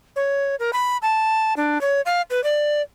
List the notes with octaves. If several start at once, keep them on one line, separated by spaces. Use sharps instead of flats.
C#5
A#4
B5
A5
D4
C#5
F5
B4
D5